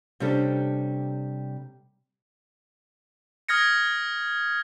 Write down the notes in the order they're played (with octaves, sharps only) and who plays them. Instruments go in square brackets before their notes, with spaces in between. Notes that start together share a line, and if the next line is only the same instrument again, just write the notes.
[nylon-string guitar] C3 G3 C#4 D4 G4 A4
[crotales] D#6 F6 G#6 A#6 C#7